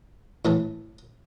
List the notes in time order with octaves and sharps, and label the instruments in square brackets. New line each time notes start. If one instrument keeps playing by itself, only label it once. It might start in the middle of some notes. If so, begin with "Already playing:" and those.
[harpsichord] A2 E3 A3